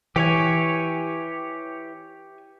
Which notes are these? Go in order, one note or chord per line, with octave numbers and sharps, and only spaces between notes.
E3 G4 C#5 G#5